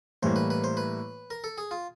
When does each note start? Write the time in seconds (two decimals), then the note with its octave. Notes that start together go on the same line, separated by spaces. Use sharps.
0.22 A2 E3 G3 A#3 C5
0.36 B4
0.50 B4
0.64 C5
0.77 B4
1.30 A#4
1.44 A4
1.58 G#4
1.71 F4